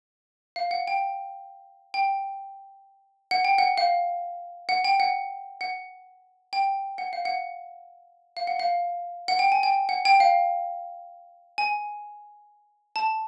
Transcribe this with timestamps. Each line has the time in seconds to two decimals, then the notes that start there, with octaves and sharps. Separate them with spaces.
0.56 F5
0.71 F#5
0.87 G5
1.94 G5
3.31 F#5
3.45 G5
3.58 F#5
3.78 F5
4.69 F#5
4.84 G5
5.00 F#5
5.61 F#5
6.53 G5
6.98 F#5
7.13 F5
7.25 F#5
8.37 F5
8.47 F#5
8.60 F5
9.28 F#5
9.39 G5
9.52 G#5
9.63 G5
9.89 F#5
10.05 G5
10.20 F5
11.58 G#5
12.96 A5